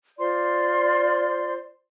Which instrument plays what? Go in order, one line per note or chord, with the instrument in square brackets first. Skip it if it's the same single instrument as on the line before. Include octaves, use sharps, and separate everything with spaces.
[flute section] F4 C5 C6 [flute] D5